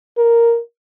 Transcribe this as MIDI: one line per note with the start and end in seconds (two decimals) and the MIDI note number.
0.17 0.59 70